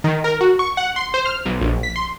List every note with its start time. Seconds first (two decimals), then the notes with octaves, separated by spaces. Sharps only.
0.04 D#3
0.24 A#4
0.41 F#4
0.59 C#6
0.77 F#5
0.96 C6
1.14 C5
1.26 F6
1.46 B1
1.61 A#1
1.83 B6
1.96 C6